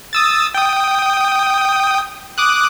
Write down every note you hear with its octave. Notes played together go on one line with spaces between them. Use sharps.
D#6 E6 A6
G5 D#6
D6 D#6 F#6